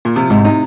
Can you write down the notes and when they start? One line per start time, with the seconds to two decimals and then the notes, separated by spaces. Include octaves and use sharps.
0.05 A#2
0.16 C3 F3
0.30 G#2 C3
0.45 C3 D#4